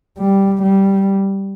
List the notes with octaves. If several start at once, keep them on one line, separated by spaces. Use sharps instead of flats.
G3
G3